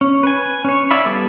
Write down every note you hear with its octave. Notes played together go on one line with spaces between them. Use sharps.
C#4
B4 G#5
C#4 C#5
E4 D5 E5 F5 B5
G3 B3 A4